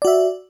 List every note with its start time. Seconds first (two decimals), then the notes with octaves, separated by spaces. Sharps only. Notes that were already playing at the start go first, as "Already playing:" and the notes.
0.02 D5
0.05 F#4
0.07 E5